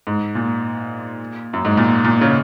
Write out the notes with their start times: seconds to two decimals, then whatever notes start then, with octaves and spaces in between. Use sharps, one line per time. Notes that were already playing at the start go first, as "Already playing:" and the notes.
0.07 G#2
0.35 A#2
1.53 F#2
1.65 G#2
1.77 A#2
2.04 A#2
2.21 C#3